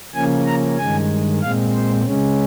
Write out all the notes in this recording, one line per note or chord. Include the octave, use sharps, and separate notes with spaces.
C#3 F3 A#3 C#4 G#5
A#5
G2 D#3 G#3 G#5
A#2 G#3 C4 F5
C5
C#3 G#3 C#4